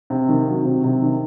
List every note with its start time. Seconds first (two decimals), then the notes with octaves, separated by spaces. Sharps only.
0.10 C3
0.29 D#3
0.47 F#3
0.65 C3
0.84 C3
1.02 D#3